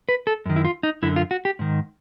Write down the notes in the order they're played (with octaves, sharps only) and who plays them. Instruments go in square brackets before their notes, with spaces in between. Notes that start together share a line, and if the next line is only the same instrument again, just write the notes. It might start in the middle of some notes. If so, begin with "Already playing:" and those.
[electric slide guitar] B4
A4
F#2 D#3
E4
F4
D#4
F#2 D3 E4
F4
F#4
G4
G#2 D#3